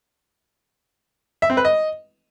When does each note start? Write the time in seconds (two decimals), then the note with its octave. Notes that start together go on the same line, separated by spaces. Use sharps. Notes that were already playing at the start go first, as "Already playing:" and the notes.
1.42 E5
1.50 C4
1.57 B4
1.65 D#5